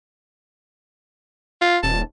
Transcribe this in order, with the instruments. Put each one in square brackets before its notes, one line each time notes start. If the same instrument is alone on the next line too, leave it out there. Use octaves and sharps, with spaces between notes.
[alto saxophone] F4
[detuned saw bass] D#1 [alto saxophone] A5